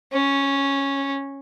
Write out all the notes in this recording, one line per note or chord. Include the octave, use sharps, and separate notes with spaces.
C#4